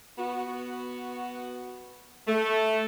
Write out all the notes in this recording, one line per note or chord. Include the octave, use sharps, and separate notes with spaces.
B3 F#4
A3